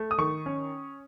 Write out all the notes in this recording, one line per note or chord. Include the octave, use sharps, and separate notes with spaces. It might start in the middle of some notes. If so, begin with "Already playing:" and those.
Already playing: A3
D#6
D#3 C#6
C#4